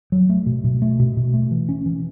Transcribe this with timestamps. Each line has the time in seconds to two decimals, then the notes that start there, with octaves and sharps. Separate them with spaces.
0.12 F#3
0.30 A3
0.46 B2
0.64 B2
0.82 A3
0.99 B2
1.17 B2
1.34 A3
1.51 E3
1.69 C#4
1.86 E3